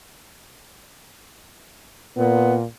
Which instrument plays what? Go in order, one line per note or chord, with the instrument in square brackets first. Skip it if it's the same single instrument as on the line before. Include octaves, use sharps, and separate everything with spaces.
[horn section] A#2 [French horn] B3